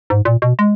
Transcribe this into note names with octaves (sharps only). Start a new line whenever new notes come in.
G#2
A#2
B2
G#3